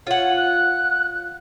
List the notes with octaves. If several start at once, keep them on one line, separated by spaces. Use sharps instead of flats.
F4 C#5 F#5
F#6